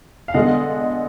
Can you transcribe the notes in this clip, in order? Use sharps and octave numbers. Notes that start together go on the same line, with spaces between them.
F5
D3 G#3 B3 D#5 F#5